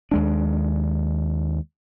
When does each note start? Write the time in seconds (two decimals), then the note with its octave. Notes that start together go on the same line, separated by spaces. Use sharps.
0.11 D#2 G#3 D4